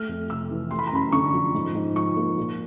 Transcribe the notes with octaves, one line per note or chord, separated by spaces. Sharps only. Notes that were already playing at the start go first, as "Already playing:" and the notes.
Already playing: A3 F6
F2
C3 E6
E3
A3 C6
B5
A#5
F#2 B5
D3 C#6
F3
G#2
G#2
F3 C#6
A#3
A#2